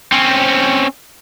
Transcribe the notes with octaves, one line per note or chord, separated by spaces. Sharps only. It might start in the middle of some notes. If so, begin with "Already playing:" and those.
C4 C#4